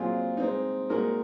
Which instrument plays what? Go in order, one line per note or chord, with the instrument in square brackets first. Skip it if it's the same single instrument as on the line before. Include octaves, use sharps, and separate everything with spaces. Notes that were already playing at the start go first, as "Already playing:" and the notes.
Already playing: [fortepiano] A#2 F#3 C4 F4 G#4
G#3 C4 D#4
A#2 G#3 D#4 F#4 A#4